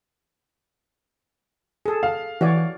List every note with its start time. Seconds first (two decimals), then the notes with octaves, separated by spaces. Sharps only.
1.86 G#4 A4
2.03 F5
2.41 E3 F#4 C#5 D5